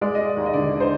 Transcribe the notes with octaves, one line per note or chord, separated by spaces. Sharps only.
G#3 D5
G#3 D#5
D5
D#2
D#5
D3 D5
D3
C5